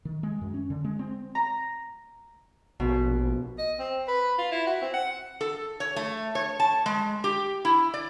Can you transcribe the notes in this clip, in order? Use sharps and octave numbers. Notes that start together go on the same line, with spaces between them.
D#3
G#3
F#2
C#4
D3
G#3
C4
A#5
A#1 B2
D#5
C4
B4
F4
E4
F#4
C4
F#5
A4
C#5
A3
C#5
A5
G#3
G4
E4
D5